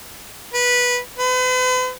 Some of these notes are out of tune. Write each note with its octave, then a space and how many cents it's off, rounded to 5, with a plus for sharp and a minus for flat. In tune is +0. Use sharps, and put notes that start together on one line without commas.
B4 -10
B4 +45